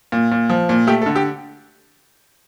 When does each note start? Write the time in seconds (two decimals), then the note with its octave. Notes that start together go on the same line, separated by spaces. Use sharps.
0.12 A#2
0.32 A#2
0.49 F3
0.69 A#2
0.87 A3 G4
1.02 A4
1.06 D3
1.15 G4